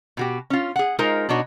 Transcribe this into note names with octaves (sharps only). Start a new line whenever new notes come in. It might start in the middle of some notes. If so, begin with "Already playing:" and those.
B2 F#4 G4
C#4 F4
G#4 F#5
G#3 D#4 F4 A#4 C5
B2 D4 D#4 F#4 C#5